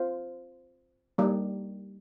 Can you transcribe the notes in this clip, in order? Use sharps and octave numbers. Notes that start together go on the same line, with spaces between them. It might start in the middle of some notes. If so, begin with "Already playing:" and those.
Already playing: C4 F4 C5 F5
G3 A#3 D#4 G4